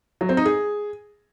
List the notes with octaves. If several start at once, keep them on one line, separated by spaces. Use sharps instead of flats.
F#3
C4
D#4
G#4